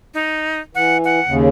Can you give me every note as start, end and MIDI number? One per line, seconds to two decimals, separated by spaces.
0.14 0.59 63
0.75 1.20 52
0.75 0.98 78
1.05 1.35 78
1.27 1.49 39
1.27 1.49 49